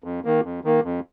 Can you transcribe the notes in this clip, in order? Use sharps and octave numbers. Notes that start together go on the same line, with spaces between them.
F2
D#3 A#3
F2
D#3 A#3
F2